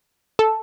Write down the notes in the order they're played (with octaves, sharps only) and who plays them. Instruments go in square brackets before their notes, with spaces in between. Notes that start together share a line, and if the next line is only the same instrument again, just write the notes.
[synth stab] A4